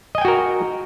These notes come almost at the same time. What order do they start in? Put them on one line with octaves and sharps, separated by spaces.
D#5 G#5 G5 F#4 A#4